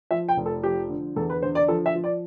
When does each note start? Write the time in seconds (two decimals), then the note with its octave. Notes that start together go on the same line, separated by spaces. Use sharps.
0.11 F3 E5
0.29 G5
0.37 F1
0.46 A4
0.63 F3 G4
0.89 D3
1.16 E2 A4
1.30 B4
1.42 D3 C5
1.55 D5
1.68 F3 A4
1.86 E5
1.95 F3
2.04 D5